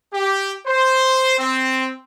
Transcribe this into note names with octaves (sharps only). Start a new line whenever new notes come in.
G4
C5
C4